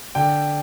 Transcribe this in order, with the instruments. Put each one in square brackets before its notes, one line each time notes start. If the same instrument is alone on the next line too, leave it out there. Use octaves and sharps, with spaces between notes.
[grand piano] D3 G5